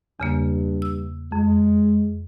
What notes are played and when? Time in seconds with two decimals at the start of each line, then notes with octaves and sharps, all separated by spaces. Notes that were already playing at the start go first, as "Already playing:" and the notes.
0.20 E2 G2 C#3 A#3
0.82 E6
1.32 F2 G#3